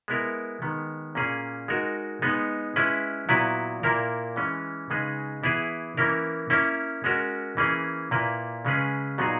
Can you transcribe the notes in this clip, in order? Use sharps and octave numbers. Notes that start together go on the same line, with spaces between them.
G#3 B3 E4 A#4
D#3 G#3 B3
A#2 A#3 C#4 G#4
G#3 D#4 F#4 A#4
G#3 B3 D#4
G#3 C#4 E4 B4
A#2 F#3 B3 E4 B4
A#2 A#3 E4 A#4
E3 G#3 C#4
C#3 G#3 D#4 G#4 B4
E3 B3 E4 G#4 B4
E3 A#3 C#4 E4 A#4
A#3 C#4 E4
G#3 C#4 F#4 A#4
E3 A#3 C#4 G#4
A#2 A#3 E4 B4
C#3 G#3 C#4 G#4 B4
A#2 F#3 B3 D#4 G#4